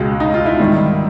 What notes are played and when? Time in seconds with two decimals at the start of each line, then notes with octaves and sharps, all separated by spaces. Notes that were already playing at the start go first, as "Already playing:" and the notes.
Already playing: C#2 B2 G#3
0.20 D#4
0.34 F4
0.46 E4
0.60 G#2 D#3 G3